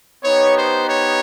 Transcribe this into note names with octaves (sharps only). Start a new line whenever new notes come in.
B3 D#4 G4 C#5
C5
C#5